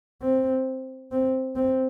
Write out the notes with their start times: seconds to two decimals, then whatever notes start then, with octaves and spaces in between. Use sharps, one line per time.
0.22 C4
1.12 C4
1.56 C4